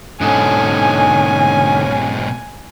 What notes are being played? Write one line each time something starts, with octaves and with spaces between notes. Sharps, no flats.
G#2 B2 D3 C#4 D#4 A4 G#5